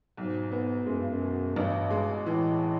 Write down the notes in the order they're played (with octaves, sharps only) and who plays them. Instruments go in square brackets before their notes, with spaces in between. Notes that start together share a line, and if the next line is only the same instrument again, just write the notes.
[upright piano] B1 [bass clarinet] G#2
[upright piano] B3
[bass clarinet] F#2 [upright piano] G#3
[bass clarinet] G2
F#2
[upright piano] B2
[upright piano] A1 [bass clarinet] G2
[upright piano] G#3
[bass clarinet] A2 [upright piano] E3